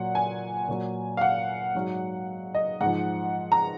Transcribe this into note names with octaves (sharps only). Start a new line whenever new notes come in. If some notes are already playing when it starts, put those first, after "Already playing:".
Already playing: A#2 F#3 F#5
G#5
A#2 F#3
F5
F#5
G#2 F#3
D#5
G#2 F3 F#5
A#5